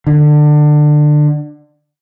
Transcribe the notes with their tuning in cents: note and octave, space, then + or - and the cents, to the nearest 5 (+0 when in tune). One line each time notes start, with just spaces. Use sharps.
D3 +25